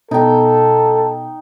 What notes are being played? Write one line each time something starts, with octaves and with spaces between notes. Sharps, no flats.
B2 D#4 A4 G5